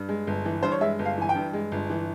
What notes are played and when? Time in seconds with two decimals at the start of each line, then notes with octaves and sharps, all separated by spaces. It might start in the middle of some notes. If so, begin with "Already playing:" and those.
Already playing: G2
0.09 G#3
0.27 G1
0.45 E3
0.63 G2 C5
0.72 C#5
0.81 G#3 E5
0.99 G1
1.05 F5
1.18 E3 G#5
1.29 G5
1.35 G2
1.53 G#3
1.72 G1
1.90 E3